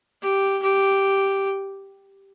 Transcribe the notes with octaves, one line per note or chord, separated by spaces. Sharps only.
G4
G4